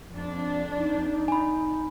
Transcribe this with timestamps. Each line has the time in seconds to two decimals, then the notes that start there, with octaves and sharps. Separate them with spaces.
0.12 F2 D4
0.78 D#4
1.28 G#5 B5